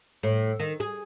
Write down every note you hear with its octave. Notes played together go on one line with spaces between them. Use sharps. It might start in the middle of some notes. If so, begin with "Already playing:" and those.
A2
D#3
G#4